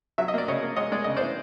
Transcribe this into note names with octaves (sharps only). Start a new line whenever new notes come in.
F#3 E5
D#5
A#3 D5
C#3 C#5 D#5
A#3
G#3 C#5 D#5
G#3 D5
C#3 D#5
E3 C5 D5